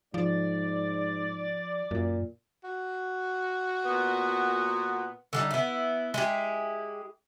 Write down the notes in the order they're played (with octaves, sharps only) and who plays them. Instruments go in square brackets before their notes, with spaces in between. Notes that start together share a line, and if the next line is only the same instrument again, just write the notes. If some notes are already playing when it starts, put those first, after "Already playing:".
[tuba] G#2 [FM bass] F3 [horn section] D5
[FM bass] F#2 [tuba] A#2
[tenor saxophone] F#4
[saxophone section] A#2 B3
[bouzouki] D3 G3 D#4
B3 E4
G#3 E4 G4